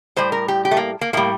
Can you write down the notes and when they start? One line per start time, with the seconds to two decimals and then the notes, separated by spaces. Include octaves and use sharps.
0.16 A2 G3 C5
0.32 A#4
0.48 G4
0.65 G4
0.71 A3
0.77 A#3
1.01 A#3
1.13 A2 G3 A#3